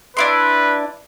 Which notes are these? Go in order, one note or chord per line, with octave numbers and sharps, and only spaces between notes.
D4 E4 B4 C6